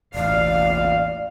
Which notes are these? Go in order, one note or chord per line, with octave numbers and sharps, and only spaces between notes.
E1 A1 D5 F5